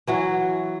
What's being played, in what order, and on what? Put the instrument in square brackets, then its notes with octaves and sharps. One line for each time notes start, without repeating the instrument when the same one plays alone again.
[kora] E3 F#3 F#4